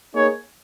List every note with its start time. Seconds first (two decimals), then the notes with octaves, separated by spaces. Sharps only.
0.15 A#3 D#4 G#4 C#5